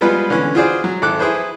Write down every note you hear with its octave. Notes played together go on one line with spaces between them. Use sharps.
F3 G3 G#3 B3 F4 B4
D3 E3 B3 C#4
F4 F#4 G#4 C5 D5
F#3
G#1 A4 D6 F#6
E4 G#4 B4 C5